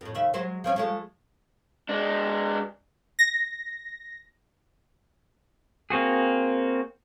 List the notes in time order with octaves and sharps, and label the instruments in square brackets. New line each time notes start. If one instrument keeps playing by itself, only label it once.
[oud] F2 A2
D#2 C#3 E5
F#3 G#3 C5
F3 C4 C#4
F3 G#3 A3
[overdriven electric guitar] G#3 D4
[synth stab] A#6
[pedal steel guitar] A#3 C4 F#4 G#4